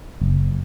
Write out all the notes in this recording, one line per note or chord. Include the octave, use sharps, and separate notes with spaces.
F#1